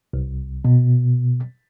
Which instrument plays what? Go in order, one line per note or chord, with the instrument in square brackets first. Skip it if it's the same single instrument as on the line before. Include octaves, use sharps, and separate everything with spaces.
[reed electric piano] C2
B2